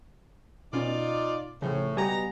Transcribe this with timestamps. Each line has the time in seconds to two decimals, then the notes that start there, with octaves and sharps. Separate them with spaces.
0.73 B2 C#4 D#4 F4 D5
1.62 A2 C#3 F3
1.97 B2 G3 B3 G4 G#5 A#5